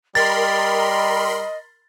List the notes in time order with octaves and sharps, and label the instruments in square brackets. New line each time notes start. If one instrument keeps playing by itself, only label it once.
[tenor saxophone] G3 [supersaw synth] A#4 B5 C6 [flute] D#5 [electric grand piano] A6